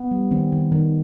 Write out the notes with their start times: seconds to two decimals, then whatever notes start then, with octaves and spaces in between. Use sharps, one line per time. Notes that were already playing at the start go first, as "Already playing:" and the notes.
Already playing: B3
0.11 G3
0.31 D#3 C4
0.52 D#3
0.72 D#3